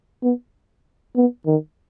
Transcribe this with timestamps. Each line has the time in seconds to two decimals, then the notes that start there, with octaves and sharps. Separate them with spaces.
0.23 B3
1.16 B3
1.46 D#3